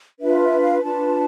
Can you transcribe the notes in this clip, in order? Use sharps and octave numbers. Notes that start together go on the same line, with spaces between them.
D4 F4 B4 E5
E5
F5
D4 F4 B4 A5